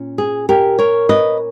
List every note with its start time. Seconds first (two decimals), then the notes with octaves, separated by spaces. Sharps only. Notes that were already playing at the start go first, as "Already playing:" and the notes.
Already playing: A#2 C#4
0.18 G#4
0.49 G4 A#4
0.79 A#4 C#5
1.09 B4 D#5